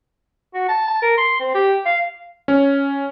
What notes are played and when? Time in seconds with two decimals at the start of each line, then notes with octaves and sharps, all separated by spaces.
0.54 F#4
0.69 A5
0.88 A5
1.02 A#4
1.18 C6
1.40 C4
1.54 G4
1.86 F5
2.48 C#4